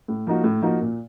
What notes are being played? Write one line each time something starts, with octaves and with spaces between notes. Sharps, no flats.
A2
F3 A#3 D#4 F#4
A2
F3 A#3 D#4 F#4
A#2